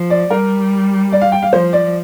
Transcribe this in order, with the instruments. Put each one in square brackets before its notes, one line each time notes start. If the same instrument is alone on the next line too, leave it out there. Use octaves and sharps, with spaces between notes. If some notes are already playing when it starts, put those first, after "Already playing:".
Already playing: [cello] F3
[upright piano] D5
[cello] G3 [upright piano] A#4
[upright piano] D5
F5
G5
F5
[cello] F3 [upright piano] C5
[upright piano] D5